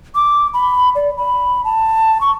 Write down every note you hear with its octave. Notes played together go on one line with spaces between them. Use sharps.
D6
B5
D5
B5
A5
C#6